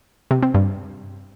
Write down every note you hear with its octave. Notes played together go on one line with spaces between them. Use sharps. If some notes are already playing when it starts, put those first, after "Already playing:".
C3
C4
G2